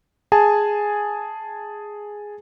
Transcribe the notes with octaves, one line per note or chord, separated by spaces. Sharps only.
G#4 G#5 A5